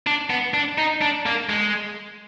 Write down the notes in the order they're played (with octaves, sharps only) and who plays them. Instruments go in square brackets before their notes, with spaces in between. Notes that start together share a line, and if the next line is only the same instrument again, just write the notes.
[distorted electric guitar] D4
B3
D4
D#4
D4
A#3
G#3